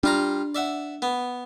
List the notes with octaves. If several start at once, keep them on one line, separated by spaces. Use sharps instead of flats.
G3 D4 F4 A#5
D5 E5 F#5
B3